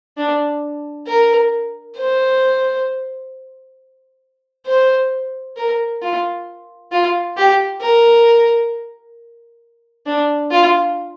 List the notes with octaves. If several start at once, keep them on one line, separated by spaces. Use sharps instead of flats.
D4
A#4
C5
C5
A#4
F4
F4
G4
A#4
D4
F4